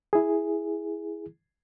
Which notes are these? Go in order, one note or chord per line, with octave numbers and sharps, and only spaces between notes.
E4 G#4